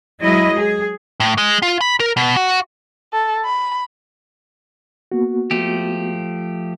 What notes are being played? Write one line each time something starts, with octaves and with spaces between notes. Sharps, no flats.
F#3 G#3 E4 D#5
G#4
A2
G#3
F4
B5
A#4
B2
F#4
A4
B5
A#3 B3 F#4
F3 A3 G4